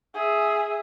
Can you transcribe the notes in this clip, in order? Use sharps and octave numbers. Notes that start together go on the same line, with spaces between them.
G#4 E5